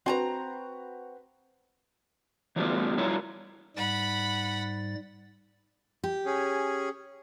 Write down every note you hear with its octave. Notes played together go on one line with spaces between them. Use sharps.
C4 F#4 B4 G#5 A#5
E3 F#3 G3 A3 B3 F4
F#3 G3 E4 F4 A#4 C#5
G#2 G3 F#5 B5 A6
G4
C#4 G#4